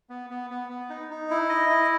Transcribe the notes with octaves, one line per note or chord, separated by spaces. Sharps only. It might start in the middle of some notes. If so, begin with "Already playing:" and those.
B3
B3
B3
B3
D#4
D#4
E4
D#5
E4